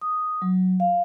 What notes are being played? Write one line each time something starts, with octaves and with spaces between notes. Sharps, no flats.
D#6
F#3
F5